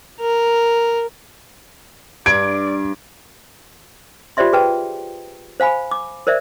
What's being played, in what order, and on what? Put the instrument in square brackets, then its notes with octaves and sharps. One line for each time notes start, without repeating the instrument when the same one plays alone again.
[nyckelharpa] A#4
[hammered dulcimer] G2 [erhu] D5 [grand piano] G#6 [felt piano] D7
[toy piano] F4 G4 C5 D5 E5 C6
G#4 B4 G5 A5
C5 F5 G#5 B5
D6
A#4 C5 D5 E5